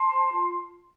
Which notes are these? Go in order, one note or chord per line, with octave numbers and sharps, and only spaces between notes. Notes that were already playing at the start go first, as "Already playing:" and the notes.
Already playing: A5 C6
C5
F4